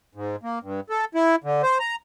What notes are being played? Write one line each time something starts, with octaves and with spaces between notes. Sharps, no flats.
G#2
A#3
G2
A4
E4
D3
C5
A#5